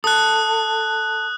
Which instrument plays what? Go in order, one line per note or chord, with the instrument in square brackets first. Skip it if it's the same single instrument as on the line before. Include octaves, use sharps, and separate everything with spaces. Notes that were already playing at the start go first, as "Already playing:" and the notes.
[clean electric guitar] A4 [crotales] D#6 F#6